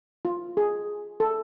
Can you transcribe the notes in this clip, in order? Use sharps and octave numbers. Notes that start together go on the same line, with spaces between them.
F4
G#4
A4